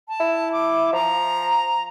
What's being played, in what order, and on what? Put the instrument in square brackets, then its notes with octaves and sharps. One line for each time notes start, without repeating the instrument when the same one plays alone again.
[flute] A5
[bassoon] E4
[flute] D6
[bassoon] F3 [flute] A#5